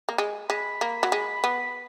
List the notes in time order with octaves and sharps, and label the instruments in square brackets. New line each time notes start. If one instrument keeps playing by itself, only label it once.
[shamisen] A#3
G#3
[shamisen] G#3 [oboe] B5
[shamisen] A#3
F#3
G#3
B3